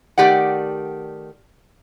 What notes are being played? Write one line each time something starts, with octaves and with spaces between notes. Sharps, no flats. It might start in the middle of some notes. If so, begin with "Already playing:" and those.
D#3 A3 G4 D5 F#5